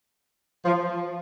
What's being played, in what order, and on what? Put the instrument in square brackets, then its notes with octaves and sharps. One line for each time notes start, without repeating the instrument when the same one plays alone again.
[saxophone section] F3